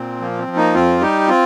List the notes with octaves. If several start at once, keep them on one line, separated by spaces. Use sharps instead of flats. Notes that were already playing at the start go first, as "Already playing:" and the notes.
Already playing: A#2 C4
F3 A#3
C4
F3
A#3 D#4
F2 C4 F4
G3 D#4 G4
C4 F4